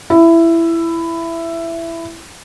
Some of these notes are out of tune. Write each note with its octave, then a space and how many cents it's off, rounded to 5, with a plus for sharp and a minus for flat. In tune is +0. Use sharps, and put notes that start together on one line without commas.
E4 +15